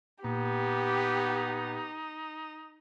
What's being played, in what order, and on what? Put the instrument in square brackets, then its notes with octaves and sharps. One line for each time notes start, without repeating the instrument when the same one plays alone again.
[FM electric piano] A#2 [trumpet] B3 [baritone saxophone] D#4 [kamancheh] G4